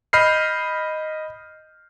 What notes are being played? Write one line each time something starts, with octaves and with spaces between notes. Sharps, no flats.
D#5 B5 F6 G6 C7